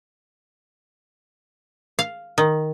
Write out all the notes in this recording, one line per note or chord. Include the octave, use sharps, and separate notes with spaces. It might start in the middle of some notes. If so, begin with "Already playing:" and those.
F5
D#3